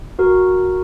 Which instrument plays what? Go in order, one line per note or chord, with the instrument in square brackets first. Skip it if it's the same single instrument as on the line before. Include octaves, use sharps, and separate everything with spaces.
[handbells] F#4 A#4